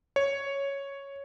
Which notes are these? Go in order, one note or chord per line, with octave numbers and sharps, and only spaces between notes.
C#5